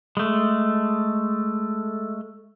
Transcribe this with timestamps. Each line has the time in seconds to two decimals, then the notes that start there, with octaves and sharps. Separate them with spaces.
0.17 G#3 A3